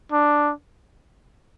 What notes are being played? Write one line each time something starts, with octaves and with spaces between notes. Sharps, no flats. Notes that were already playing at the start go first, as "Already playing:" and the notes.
D4